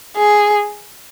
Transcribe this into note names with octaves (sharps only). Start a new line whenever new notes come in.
G#4